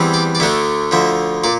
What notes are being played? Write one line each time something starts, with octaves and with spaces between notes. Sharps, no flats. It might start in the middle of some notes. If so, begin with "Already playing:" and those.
Already playing: E2 E3 G3 C4
D5
D5
D2 D3 A3 D4 E5
D2 D3 F3 E5
A#2 D5